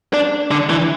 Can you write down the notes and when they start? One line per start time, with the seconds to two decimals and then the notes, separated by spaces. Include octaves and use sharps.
0.14 D4
0.51 D3
0.70 E3